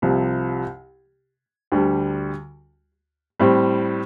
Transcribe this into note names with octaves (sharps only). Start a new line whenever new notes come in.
C2 C3 F3
D2 D3 G3
A2 G3 C4